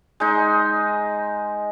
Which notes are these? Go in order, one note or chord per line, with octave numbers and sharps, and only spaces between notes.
G#3 D#4